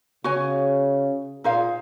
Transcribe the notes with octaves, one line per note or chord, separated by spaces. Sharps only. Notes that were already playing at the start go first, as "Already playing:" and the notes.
C#3 F#4 C#5 G#5
A#2 D#4 G#4 C5 F5